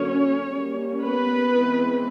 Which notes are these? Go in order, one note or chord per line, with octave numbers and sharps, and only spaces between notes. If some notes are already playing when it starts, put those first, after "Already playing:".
Already playing: D3 F#3 A#3 C#4 C#5
G3 A#3 C#4
B3 B4
E3 G#3 C4